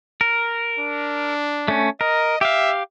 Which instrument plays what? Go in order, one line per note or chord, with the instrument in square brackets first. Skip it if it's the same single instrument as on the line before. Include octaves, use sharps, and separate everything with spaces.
[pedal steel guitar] A#4
[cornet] D4
[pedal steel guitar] A3 C#4
[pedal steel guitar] A#4 [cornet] D#5
[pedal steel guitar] G4 F5 [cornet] E5